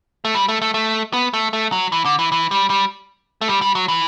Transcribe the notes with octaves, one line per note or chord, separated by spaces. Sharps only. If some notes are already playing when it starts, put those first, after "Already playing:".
A3
G3
A3
A3
A3
B3
A3
A3
F#3
E3
D3
E3
E3
G3
G3
A3
G3
G3
F#3
E3